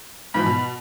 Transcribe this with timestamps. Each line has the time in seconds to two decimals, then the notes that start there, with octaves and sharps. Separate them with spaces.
0.34 G#2 E3 F3 B5
0.46 B2